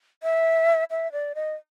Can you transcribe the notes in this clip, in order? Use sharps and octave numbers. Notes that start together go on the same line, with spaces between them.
E5
E5
D5
D#5